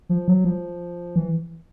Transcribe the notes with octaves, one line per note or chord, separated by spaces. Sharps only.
F3
F#3
F3
E3